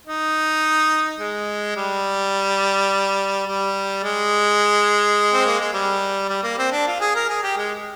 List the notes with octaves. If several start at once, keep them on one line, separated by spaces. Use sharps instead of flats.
D#4
G#3
G3
G3
G#3
C4
A#3
G#3
G3
G3
A#3
C4
D4
F4
G#4
A#4
G#4
G4
G#3